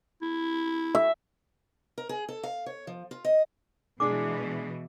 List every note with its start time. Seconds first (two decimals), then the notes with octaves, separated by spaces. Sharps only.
0.22 E4
0.95 E5
1.98 A#4
2.09 G#4
2.29 A4
2.43 F5
2.66 C#5
2.87 F3
3.11 F4
3.25 D#5
4.00 B2 E3 G#3 D4 G#4 D6